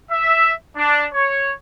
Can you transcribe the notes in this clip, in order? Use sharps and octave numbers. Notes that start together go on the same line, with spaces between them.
E5
D4
C#5